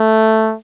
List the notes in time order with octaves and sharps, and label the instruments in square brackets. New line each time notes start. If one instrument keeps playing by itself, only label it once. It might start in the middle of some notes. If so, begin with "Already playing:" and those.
Already playing: [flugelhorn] A3